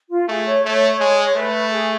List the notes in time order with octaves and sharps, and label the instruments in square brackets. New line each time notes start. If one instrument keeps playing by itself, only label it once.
[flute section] F4
[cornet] A3 [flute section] G#4
[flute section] C#5
[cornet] A3 [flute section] C#5
[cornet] G#3
[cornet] A3 [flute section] B4
[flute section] G#4